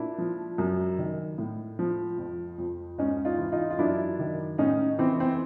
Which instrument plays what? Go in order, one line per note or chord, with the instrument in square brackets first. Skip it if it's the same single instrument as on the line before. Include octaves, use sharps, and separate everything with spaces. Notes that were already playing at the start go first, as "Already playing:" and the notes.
Already playing: [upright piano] A#2 D4 E4
F3
F#2
D#3
A2
F3
F2
F2
G#2 C#4 D#4
D#4 F4
E3
D#4 F4
F4
F#2 D4 E4
D#3
A2 C#4 D#4
E3 C4
C4